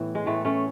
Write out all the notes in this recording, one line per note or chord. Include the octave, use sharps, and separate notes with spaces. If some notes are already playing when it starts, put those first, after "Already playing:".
Already playing: A2 E3 B3
G#3
A2 E3 A3
A3 C#4